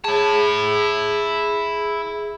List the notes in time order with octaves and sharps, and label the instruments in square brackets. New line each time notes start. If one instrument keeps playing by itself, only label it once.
[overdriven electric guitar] E4 A5 [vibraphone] G#4